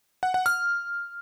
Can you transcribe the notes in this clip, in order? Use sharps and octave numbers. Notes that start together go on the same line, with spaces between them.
F#5
F#5
F6